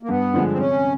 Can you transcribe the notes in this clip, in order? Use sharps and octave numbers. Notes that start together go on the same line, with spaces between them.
A#3
G2 B3
D3 F3 G#3
C4
C3 C#4